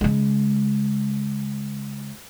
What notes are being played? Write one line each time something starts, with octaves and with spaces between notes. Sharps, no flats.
C#3 G#3